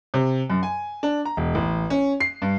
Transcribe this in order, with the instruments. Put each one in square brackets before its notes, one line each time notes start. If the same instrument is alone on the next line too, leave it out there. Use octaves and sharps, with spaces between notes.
[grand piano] C3
F#2
G#5
D4
A#5
E1
A1
C#4
C7
G2